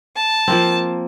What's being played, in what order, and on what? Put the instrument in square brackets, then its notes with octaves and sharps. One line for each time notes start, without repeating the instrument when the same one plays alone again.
[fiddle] A5
[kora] F3 A#3 C4